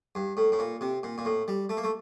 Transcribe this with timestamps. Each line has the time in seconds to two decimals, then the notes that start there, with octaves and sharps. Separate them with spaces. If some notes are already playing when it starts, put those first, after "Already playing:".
0.15 G2
0.37 A2
0.52 A2
0.59 A#2
0.81 C3
1.03 A#2
1.18 A#2
1.25 A2
1.48 G3
1.69 A3
1.77 A#3
1.84 A3